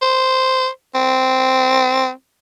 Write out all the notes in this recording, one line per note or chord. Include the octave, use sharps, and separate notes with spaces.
C5
C4